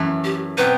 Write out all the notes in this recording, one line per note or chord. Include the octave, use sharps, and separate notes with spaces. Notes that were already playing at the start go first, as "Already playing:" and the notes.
Already playing: F#2 E3 A3
G4
B2 F#3 C4 G4 B4